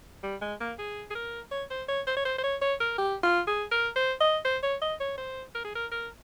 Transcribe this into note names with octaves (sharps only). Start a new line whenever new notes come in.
G3
G#3
A#3
G#4
G#4
A#4
C#5
C5
C#5
C5
C#5
C5
C5
C#5
C#5
A#4
G4
F4
G#4
A#4
C5
D#5
C5
C#5
D#5
C#5
C5
A#4
G#4
A#4
A#4